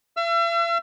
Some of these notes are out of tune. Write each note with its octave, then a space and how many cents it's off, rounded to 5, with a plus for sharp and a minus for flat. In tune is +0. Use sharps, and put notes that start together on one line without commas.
E5 +45 E6 +40